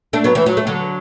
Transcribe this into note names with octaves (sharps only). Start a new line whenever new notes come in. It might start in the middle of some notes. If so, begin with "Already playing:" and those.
A3 D4
F#3 B3
E3 A3
F#3
A3
D3 F#3